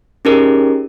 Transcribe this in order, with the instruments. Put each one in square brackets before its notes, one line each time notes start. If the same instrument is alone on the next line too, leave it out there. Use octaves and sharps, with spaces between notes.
[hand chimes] C#4 D#4 G4 G#4 A#4